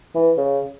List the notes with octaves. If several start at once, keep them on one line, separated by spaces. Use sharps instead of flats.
E3
C#3